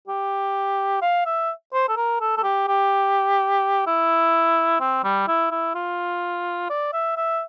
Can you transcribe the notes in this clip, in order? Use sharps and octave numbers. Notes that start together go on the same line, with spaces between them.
G4
F5
E5
C5
A4
A#4
A4
A4
G4
G4
E4
C4
G3
E4
E4
F4
D5
E5
E5